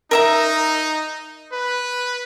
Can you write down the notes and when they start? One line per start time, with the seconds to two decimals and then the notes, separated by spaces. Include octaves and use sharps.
0.11 D#4 A#4 E5 A#5
1.52 B4